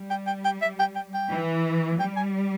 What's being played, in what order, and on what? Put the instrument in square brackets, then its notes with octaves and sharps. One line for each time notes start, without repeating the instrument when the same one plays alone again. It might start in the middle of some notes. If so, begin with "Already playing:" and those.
Already playing: [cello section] G3
[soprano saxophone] G5
G5
G5
E5
G5
G5
G5
[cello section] E3
[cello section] G3 [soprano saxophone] G5
[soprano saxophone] G#5